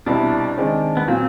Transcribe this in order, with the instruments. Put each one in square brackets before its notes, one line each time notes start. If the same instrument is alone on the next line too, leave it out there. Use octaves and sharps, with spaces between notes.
[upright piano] C2 B2 G3 B3 E4 [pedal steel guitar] D4
[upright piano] C3 D#3 G#3 C4
[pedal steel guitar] B3
[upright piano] A#2 F#3 [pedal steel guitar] C4